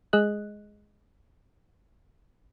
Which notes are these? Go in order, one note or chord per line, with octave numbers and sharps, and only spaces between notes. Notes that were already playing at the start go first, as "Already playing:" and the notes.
G#3 G#4 D#5 F#6